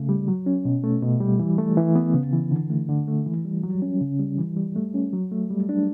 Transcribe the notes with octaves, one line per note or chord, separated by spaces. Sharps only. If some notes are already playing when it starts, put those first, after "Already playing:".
Already playing: C#3 A3
G3
F#3
C#4
B2
A3
B2
G3
E3
A3
E3
B3
C#3
E3
D3
A3
D3
A3
E3
G3
F#3
C#4
C#3
G3
E3
G3
A3
C#4
F#3
A3
G3
D4